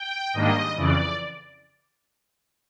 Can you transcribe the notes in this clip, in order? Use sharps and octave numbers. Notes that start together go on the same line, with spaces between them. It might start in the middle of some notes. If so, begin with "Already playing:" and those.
Already playing: G5
G#2 D#3 G3 A#3 D4 D#5
F2 C#3 E3 D5